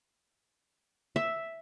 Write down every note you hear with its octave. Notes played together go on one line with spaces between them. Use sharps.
E5